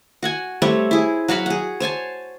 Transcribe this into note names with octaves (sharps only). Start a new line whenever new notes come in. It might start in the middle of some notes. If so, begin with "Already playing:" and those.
F#4 F#5 G#5
G3 A3 C4 C#5
E4 G#4
F#3 F#4 F5 B5
G#4 F#5
C5 C#5 G#5 A5